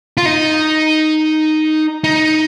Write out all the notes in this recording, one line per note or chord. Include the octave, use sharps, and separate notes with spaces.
F4
D#4
D#4